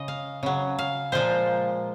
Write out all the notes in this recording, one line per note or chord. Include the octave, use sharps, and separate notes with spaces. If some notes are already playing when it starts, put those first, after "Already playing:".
Already playing: C#3 D#5
F5
C#3 F#3
F5
A#2 F3 G#3 C5